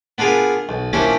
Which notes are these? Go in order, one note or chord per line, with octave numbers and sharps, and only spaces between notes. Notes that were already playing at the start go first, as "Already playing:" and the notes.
B3 D4 F4 G#4 A#4
B1
F3 A#3 C#4 D4 E4 G4